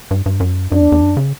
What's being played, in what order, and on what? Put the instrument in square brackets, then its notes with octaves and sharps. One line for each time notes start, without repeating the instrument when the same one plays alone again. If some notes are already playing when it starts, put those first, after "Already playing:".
[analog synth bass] G2
G2
F#2
[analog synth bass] F#2 [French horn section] D4
[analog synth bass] E2
E2
F#2
C#3